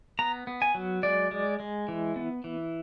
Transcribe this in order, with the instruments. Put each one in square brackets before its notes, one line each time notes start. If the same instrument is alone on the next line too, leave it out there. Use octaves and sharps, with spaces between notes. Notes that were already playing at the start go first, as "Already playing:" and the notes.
[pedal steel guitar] B3 A#5
B3
G#5
F#3
G#3 D5
G#3
G#3
E3
B3
E3